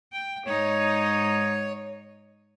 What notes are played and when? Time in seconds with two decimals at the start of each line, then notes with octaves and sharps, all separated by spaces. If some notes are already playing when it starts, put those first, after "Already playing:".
0.13 G5
0.46 G#2 D#4 C#5